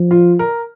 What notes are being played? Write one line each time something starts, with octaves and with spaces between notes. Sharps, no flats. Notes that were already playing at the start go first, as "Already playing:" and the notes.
Already playing: F3
F4
A#4